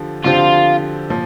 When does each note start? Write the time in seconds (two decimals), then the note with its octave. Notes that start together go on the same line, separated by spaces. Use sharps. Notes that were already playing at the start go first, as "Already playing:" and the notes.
Already playing: D3 F3 G4
0.25 D3 F3 C4 F4 G4
1.10 A#2 F3